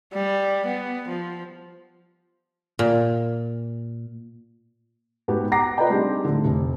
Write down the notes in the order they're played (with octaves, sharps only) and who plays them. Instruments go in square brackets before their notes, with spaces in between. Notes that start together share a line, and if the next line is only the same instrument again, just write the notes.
[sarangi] G3
B3
F3
[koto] A#2
[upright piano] G#2 B3 F#4 G4
F#5 A#5 D6 A#6 C7
F4 B4 D5 D#5 G5 A#5
G3 C4 D4 D#4 G4 G#4
A2 D3
F1